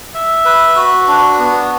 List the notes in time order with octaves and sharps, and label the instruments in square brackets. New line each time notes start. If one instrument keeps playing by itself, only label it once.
[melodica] E5
B4
F#4
D4
B3